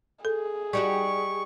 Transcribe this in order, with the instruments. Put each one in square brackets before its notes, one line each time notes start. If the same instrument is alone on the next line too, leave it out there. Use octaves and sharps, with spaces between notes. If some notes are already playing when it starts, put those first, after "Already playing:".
[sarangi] G#4 [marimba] A4
[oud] G3 D#4 F#4 [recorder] C#6